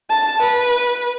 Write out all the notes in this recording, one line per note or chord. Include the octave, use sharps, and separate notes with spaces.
A5
B4